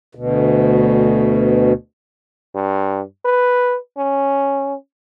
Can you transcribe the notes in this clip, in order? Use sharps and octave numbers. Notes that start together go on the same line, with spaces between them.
D2 B2
G2
B4
C#4